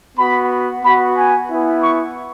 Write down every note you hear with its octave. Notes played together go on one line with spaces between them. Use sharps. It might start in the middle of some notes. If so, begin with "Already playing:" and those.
B3 F#4 B5
B3 F#4 B5
G#5
B3 E4
C#6